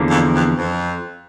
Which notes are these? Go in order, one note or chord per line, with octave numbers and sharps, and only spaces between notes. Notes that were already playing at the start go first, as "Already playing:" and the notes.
Already playing: E2 D3 F3 A#3
F2
F2
F2